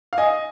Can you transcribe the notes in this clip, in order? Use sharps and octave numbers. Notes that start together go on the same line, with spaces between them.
F5
D#5 G#5